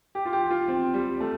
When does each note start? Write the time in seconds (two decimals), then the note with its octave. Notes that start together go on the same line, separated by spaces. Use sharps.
0.15 G4
0.26 F4
0.33 G4
0.50 F4
0.68 C4
0.94 G3
1.20 A3